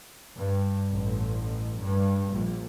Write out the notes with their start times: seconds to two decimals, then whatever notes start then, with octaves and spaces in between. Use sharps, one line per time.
0.36 G2
0.93 A1
1.82 G2
2.33 A#1